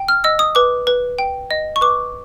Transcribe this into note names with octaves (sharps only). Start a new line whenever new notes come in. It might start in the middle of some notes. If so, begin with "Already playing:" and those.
Already playing: G5
F6
D#5 E6
D#6
B4 D6
B4
G5
D#5
C#6
B4 D6